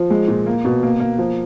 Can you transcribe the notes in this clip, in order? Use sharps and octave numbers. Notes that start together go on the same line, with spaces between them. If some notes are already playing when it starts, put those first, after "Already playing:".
Already playing: F3
G#3
A#2
A#3
B2
A#3
A#3
F3